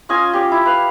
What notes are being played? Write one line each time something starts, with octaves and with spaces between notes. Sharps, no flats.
C#4 F4 D#5 G#5
G4 D5
E4
B4 F5